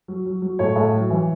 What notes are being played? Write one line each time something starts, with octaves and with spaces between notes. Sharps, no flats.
F#3
F#3
F#3
A2 C#5
A2
F#3
E3